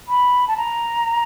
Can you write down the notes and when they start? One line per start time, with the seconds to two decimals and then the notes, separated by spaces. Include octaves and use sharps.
0.09 B5
0.48 A5
0.57 A#5